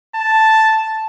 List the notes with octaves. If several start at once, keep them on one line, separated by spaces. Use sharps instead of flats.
A5